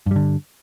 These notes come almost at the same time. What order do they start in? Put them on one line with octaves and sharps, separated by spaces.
G2 G3 D3